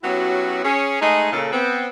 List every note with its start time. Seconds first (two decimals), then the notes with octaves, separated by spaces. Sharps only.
0.03 F#3 B3 C#4 E4 F#4 G4
0.63 C#4 G#4
1.01 G#3 A3 D#4 G#4 D#5
1.32 A#2 C#3 A4
1.52 B3 C4